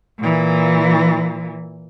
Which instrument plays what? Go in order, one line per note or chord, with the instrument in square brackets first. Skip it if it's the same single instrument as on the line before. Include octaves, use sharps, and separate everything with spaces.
[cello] A#2 E3